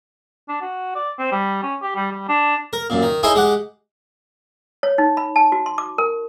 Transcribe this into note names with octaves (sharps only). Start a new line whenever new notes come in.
D4
F#4
D5
C4
G3
C#4
G4
G3
G3
D4
A#4
F#2 A#2
D#3
D#4 E4 G#4 C#5 G#5 C6
G#3 G4 F#5
C#5
D#4
B5
A5
F#4
C6
D6
A#4